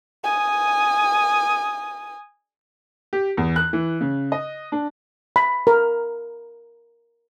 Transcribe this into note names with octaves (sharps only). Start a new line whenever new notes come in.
G#5 D#6
G4
E2
F#6
E3
C#3
D#5
D4
B5
A#4